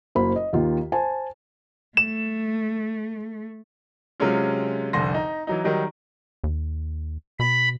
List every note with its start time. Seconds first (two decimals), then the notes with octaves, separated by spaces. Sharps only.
0.15 F#1 A#3 F#4 C5 B5
0.36 D#5
0.53 D#2 D#3 F4
0.92 C5 G#5 A5
1.97 A3 E7
4.20 C3 F#3 G#3 C#4 F4
4.93 F1 C2 D3 C6 A#6
5.14 D#4
5.47 E3 F#3 D#4
5.64 D#3 F#3 G3 D#4
6.44 D#2
7.40 B2 B5